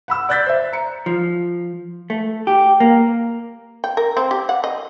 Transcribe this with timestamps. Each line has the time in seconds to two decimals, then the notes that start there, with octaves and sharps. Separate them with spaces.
0.08 F#5 B5 E6
0.29 D5 F#6 G6 A6 B6
0.46 C5 E5
0.72 A#5 C#7
1.06 F3
2.10 A3
2.47 G4
2.80 A#3
3.84 G5
3.97 A#4
4.17 C4
4.31 G4
4.49 F#5
4.64 D#5